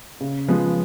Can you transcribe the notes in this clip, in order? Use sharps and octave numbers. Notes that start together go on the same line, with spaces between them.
C#3
F3 G#3 B3